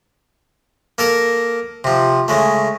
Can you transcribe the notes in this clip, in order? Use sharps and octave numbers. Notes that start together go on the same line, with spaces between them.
A#3 A4 A#4
C3 F3
C#3 G#3 A3